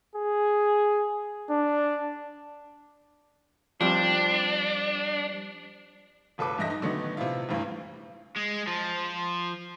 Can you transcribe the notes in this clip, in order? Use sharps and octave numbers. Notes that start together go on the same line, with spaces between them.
G#4
D4
F3 G3 C4 D4
D1 G1 A4 B4 D6
E2 G2 D#5 E5 A#6
D#4
D3 D#3 F#3 A3 B3 D#4
C3 F3 B3 E4 F4
G1 D2 G2 E3
G#3
F3